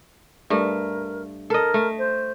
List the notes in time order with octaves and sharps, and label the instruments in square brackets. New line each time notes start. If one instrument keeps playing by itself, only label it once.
[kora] G2 A3 [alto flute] A#4
[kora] A4 D#5 [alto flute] A#4
[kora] A3
[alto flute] C5